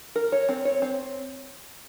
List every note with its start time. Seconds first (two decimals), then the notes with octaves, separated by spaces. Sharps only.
0.16 A#4
0.32 C#5
0.49 C4
0.65 C#5
0.82 C4